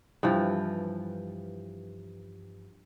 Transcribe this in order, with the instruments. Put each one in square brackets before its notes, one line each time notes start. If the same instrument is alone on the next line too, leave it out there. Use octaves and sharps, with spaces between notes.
[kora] G2 E3 F3